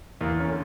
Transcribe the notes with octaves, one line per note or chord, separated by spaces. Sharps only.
E2 A#3
C#4
D3